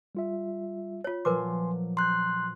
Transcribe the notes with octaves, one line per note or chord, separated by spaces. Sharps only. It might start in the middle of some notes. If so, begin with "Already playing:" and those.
G3 F4 E5
F4 C#5
A#2 F3 F#3 A#4 B4 G#5 C6 D6
A#5 C6 F#6 G6